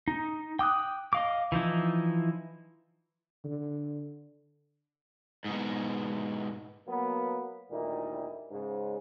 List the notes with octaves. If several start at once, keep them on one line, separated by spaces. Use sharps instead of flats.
D#4
G5 D6 D#6 F#6
D#5 F5 D6
E3 F3 D#4 E4
D3
G#2 B2
F#3 A#3 B3
D2 A#2 D#3 G3 D#4 E4
G#2 C#3